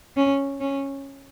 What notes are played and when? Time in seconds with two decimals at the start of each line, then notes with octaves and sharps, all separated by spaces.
0.16 C#4
0.60 C#4